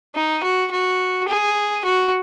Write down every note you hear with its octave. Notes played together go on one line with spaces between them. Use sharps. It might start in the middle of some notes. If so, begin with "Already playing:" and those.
D#4
F#4
F#4
G#4
F#4